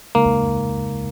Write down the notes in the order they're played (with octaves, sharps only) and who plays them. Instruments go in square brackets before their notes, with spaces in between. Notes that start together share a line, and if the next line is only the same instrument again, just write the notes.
[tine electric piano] C#3 G#3 D#4 [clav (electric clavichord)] A#3